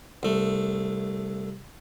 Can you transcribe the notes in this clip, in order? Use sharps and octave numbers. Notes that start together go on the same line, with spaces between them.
C2 A3